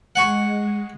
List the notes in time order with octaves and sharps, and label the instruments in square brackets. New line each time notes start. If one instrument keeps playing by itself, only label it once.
[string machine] G#3 [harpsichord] F#5 G#5 C#6